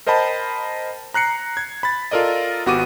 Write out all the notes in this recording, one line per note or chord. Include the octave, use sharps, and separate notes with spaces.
A#4 C5 D#5 G5 A5 B5
A#5 F#6 C7 C#7
G#6
B5 A6
F4 A4 A#4 D5 D#5
G#1 B3 F#4 G4 D6 D#7